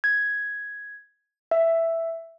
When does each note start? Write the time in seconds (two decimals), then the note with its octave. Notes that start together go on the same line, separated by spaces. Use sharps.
0.04 G#6
1.51 E5